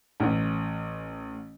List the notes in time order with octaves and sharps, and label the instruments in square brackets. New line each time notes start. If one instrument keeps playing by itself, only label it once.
[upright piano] A1